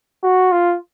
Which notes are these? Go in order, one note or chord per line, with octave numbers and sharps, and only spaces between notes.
F#4
F4